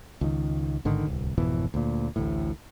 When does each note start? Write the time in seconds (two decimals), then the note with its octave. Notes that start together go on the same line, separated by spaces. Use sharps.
0.21 C#2 D#3
0.85 A1 G#2 D3 D#3
1.05 D1 C2
1.37 G#1 F2 B2 E3
1.74 D2 A#2
2.16 A1 D2 A2